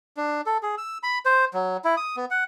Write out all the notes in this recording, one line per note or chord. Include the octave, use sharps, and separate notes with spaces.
D4
A4
G#4
E6
B5
C5
F#3
E4
D#6
B3
F#5